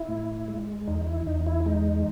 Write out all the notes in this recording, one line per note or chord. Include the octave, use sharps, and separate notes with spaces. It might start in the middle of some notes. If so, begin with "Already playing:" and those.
Already playing: E4
A2
G#3
E2 D#4
E4
E2 D#4
E4
G#3 D#4